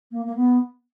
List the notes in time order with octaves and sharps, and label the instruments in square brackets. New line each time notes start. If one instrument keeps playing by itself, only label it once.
[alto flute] A#3
A#3
B3